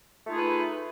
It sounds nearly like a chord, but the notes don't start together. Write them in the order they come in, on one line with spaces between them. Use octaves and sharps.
A3 F4 D#4 G#4 B4